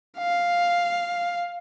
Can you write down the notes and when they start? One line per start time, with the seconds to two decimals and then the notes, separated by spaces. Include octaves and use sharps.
0.18 F5